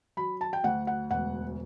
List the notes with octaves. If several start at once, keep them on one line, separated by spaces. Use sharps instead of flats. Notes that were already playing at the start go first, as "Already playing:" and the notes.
F#3 B5
A5
G5
D2 F#5
F#5
E1 F#5